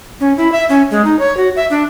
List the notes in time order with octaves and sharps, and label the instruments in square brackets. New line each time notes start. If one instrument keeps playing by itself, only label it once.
[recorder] C#4
E4
E5
C#4
G#3
D#4
C#5
F#4
E5
D4